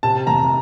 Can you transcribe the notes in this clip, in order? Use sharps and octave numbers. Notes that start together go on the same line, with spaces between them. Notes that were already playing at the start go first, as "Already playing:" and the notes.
C3 A5
F1 A#5